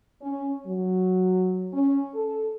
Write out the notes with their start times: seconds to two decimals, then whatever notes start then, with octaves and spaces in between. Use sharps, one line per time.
0.21 C#4
0.65 F#3
1.73 C#4
2.14 A4